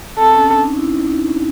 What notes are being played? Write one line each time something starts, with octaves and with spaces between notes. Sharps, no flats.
C4 A4
C#4
D4
D#4
E4
D#4